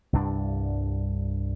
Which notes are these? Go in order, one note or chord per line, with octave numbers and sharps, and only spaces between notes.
C2 G2 D4